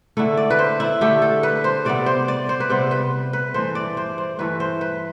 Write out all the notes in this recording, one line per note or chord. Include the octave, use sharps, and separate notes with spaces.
D3 A3 E4
D5
B4
C5
E4
D3 A3 G4
A4
B4
C5
C3 G3 B3 D5
C5
D5
C5
B4
C3 G3 B3 C5
B4
B4
G2 E3 A3 C5
D5
C5
C5
G2 E3 A3 B4
C5
B4